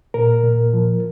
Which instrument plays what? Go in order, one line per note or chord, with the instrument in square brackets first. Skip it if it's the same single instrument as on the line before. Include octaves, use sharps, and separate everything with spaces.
[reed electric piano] A#2 A#4
A#2
F3